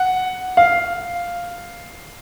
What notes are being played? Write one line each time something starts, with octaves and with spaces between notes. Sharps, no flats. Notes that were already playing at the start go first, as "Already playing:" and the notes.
Already playing: F#5
F5